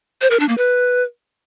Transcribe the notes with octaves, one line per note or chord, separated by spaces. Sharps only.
C5
A#4
D4
A#3
B4